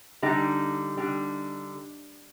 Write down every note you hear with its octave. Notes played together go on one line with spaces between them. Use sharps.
D3 G3 D#4
D3 G3